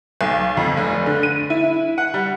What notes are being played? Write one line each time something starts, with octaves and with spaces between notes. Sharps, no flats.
B1
F2
F1
D3
D#7
E4
E4
F#5
G3